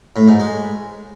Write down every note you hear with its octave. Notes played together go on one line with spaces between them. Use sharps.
A2
G#2
G#3